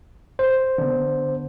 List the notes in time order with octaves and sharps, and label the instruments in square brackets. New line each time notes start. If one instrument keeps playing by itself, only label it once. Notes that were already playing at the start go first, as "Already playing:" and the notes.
[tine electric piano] C5
[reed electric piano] D3 B3